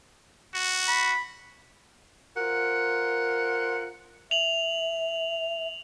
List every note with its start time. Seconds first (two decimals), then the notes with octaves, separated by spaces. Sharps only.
0.54 F#4
0.88 B5
2.37 F4 A#4 C5 F#5
4.31 E5 F7 F#7